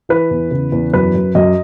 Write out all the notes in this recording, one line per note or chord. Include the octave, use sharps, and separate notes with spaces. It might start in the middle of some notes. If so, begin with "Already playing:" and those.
E3 B4
E2
C#3
E2
F#2 B4
F#2
F#2 D#5